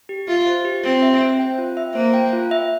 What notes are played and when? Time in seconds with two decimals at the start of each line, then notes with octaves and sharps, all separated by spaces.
0.09 G4
0.28 F4 E5
0.47 C5
0.65 G4
0.84 C4 G4
1.02 E5
1.21 C5
1.40 G5
1.58 F4
1.77 E5
1.95 A#3 C5
2.14 G5
2.33 F4
2.51 E5